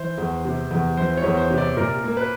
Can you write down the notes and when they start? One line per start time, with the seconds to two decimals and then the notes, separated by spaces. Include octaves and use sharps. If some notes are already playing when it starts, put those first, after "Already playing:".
Already playing: E3 C5
0.18 E2
0.45 C3
0.71 E2
0.97 E3 C5
1.17 C#5
1.24 E2
1.37 C5
1.50 C3
1.58 D5
1.77 A#2 A#4
2.04 A#3
2.17 B4